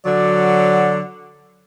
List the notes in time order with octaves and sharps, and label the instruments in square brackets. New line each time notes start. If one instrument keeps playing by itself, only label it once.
[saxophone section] D3 F#3 [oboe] D5